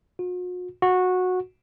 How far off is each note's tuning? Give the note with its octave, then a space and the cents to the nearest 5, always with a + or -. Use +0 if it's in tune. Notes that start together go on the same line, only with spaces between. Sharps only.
F#4 -45
F#4 -15